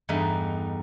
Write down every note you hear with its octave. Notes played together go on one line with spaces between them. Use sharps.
E2 G2 A3 D#4